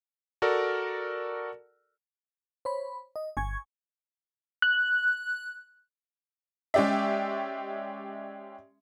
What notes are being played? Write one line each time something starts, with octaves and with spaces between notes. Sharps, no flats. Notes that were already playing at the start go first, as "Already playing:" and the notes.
F#4 A4 A#4 D5
C5 C#5 B5
D#5
G1 G#5 C#6 G#6
F#6
G#3 C#4 G4 D5 E5